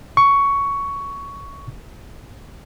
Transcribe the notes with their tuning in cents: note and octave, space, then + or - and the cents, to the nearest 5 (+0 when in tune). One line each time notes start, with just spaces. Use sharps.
C#6 +10